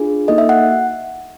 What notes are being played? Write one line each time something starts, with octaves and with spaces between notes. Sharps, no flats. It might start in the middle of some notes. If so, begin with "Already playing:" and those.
Already playing: D4 F4 G#4
A#3 D#4 F#4 A4 D#5
E5
F#5